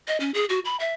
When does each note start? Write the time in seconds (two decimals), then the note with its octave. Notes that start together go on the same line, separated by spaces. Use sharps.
0.07 D#5
0.20 C#4
0.34 G#4
0.49 F#4
0.65 B5
0.80 E5